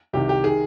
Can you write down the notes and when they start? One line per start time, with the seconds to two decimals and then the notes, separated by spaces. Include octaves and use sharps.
0.13 C2 C3 D#3 G4
0.29 G4
0.44 D#3 G#4